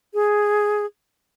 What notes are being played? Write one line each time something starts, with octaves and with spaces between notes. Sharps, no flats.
G#4